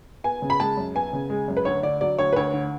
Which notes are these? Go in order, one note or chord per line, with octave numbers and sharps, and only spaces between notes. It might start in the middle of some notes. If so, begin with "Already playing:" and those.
B3 G#5
C#3
B5
G#3 A5
F#2
B3 G#5
C#3
G#3
F#2
B4
D2 C#5
D3 D5
F#3 D5
D2 C#5
B4
D2 C#5
D3